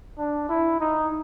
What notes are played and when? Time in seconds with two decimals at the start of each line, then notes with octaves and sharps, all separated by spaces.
0.18 D4
0.49 E4
0.80 D#4